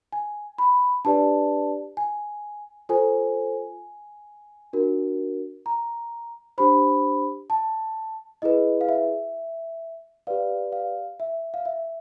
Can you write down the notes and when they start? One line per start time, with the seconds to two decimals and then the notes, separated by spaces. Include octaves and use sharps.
0.12 G#5
0.58 B5
1.05 D4 G4 B4 D5 A5
1.97 G#5
2.89 F4 A4 C5 G#5
4.73 D4 F#4 A#4
5.66 A#5
6.58 D4 G4 C5 B5
7.50 A5
8.42 E4 G#4 B4 D#5
8.81 F5
8.89 E5
10.27 G4 B4 D5 F5
10.72 F5
11.20 E5
11.54 F5
11.65 E5